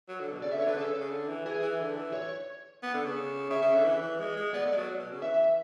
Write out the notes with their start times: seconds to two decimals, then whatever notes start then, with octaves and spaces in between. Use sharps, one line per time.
0.09 F#3
0.20 D3
0.32 B2
0.42 C#3 D5
0.52 E5
0.54 D3
0.60 C#5
0.66 D3 B4
0.77 C#3 A4
1.00 C#3
1.11 D3
1.29 E3
1.46 E3 G#4
1.63 E3
1.80 D3
1.97 E3
2.13 C#5
2.83 B3
2.94 D3
3.05 C#3
3.50 C#3 E5
3.62 C#3
3.74 D3
3.85 E3
4.02 E3
4.19 G#3
4.37 G#3
4.54 B3 D5
4.65 A3
4.71 G#3
4.76 F#3
4.99 B2
5.11 C#3
5.22 E3 E5